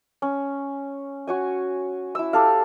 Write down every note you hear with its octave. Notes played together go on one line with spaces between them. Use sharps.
C#4
F#4 C#5 G#5
E4 E6
G4 A4 F5